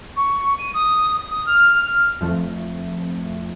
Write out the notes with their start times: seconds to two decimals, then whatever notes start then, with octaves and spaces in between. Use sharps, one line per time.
0.16 C#6
0.58 D#7
0.73 D#6
1.29 D#6
1.46 F6
1.78 F6
2.21 F2 F3 A3